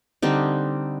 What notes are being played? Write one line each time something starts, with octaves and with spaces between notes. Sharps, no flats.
D3 G3 C4 D#4